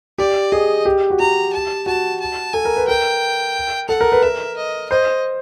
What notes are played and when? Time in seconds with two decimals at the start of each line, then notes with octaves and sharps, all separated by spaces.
0.18 G4 D5
0.52 G#4 D#5
0.85 G4
1.10 F#4
1.19 G4 A#5
1.53 A5
1.86 F#4 A5
2.21 A5
2.54 A4 G#5
2.65 A#4
2.76 B4
2.88 A#4 G5
3.89 A4 F#5
4.01 A#4
4.12 B4
4.22 A#4 E5
4.57 D#5
4.90 C5 D#5